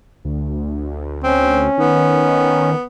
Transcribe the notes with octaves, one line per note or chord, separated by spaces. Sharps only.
D2
C4 C#4
D#3 B3